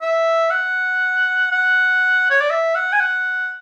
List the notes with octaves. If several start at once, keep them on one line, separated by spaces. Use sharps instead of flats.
E5
F#5
F#5
C#5
D5
E5
F#5
G#5
F#5